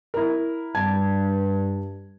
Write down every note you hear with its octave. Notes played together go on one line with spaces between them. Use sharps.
E4 A#4
G2 A5 G#6